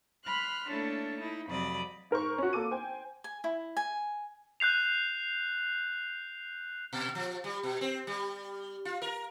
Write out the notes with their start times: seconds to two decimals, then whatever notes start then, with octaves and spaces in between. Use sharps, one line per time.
0.23 B5 C6 F6 F#6
0.70 A3 A#3 C#4 D4 E4 A4
1.16 D#4 E4
1.48 F2 C3 F#3 D5 B5 D#6
2.11 G#2 A#4 C5 C#6
2.38 C#4 F#4
2.53 A#3 A4 D6 D#7
2.71 C5 G5 G#5
3.24 G#5
3.44 E4
3.77 G#5
4.60 F#6 G6 C7 F7
6.93 A#2
7.15 F3
7.44 G3
7.63 B2
7.81 C4
8.07 G3
8.85 F4
9.02 A#4